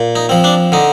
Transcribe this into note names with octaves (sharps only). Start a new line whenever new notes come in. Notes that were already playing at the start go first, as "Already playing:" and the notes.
Already playing: A#2
D#4
F3 C4
D4
D3 D#4